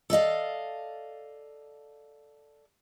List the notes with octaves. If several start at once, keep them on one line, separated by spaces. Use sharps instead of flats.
A4 D5 D#5 F5